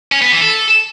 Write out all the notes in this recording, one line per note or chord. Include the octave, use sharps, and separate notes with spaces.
C#4
B3
E3
A4